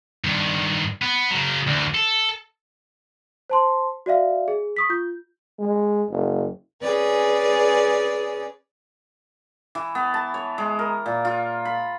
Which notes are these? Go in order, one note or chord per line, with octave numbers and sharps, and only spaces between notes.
G2 D#3
B3
C#3 F#3
D2 E3
A4
C5 A5 C6
F#4 D5 E5 F5
G#4
C#6 D#6 B6
F4 G6
G#3
F#1
C#4 G#4 B4 D5
E3
B3
A5
C#5
G#3
A#4
A#2
F4
B5